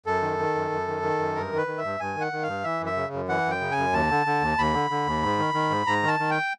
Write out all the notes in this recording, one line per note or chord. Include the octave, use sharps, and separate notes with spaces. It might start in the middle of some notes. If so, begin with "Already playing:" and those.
F#2 A4
D#3
D#3
F#2
F#2
D#3
D#3
F#2
G2 A#4
D#3
B4
D#3
E5
G2
G2 G#5
D#3
F#5
D#3
G2 F5
E3 E5
F#2
E5
C#3
F#2
E3 F#5
F#2
G5
C#3
G#5
F#2
D#2 A5
D3
D3
D#2
D#2 B5
D3
D3
D#2
G#2
D#3
D#3
G#2
G#2 A#5
D#3 A5
D#3
G5